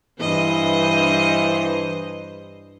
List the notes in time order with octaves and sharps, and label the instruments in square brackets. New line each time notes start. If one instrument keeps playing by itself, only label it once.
[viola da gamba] G2 C5 D#5 [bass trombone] E3